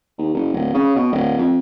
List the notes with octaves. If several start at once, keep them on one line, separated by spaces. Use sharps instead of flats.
D#2
F#1
D1
C#3
B2
D1
F2